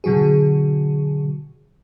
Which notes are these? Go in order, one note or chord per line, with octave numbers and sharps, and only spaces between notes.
B2 D3 F#3 F#4 G#4